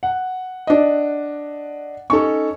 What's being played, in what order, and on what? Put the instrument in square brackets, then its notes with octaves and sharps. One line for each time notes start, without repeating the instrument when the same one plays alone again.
[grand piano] F#5
[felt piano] D4 D#5
[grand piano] C#4 D#4 A4 [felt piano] C#6